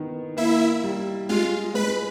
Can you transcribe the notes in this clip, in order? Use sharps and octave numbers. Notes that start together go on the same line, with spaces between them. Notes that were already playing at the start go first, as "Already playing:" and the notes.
Already playing: D#3 B3
A#3 E4 E5
G3
G#3 F4 F5
G#3 B4 B5